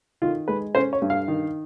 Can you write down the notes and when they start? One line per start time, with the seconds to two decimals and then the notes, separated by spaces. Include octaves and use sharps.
0.22 D#3 F4
0.48 G#3 B4
0.75 C#4 C5
0.93 C#5
1.02 G2
1.10 F5
1.28 D#3